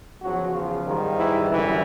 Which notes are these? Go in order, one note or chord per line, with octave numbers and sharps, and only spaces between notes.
E2 C#3 F3 F#3 F#4
F3 F4
G#2 D#3 G3
E3 E4
F#2 D3 E3 G3 E4